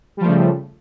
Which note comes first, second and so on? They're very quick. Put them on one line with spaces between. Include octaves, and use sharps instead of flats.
G3 F3 A3 C#3